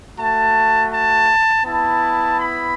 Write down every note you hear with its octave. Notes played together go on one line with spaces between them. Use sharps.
A3 F#4 A5
A5
B3 E4 A5
B5